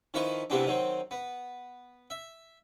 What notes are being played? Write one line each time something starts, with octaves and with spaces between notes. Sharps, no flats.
D#3 F3 E4 B4 C6 C#6
C3 E3 G3 B3 C4 D4
D#3 F#3 C4
B3
E5